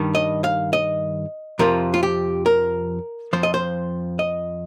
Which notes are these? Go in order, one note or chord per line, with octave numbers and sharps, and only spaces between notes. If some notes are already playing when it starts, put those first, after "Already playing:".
Already playing: G2 D#3 G3
D#5
F5
D#5
F2 C3 F3 A#4
F4
G4
A#4
F2 F3 C5
D#5
C5
D#5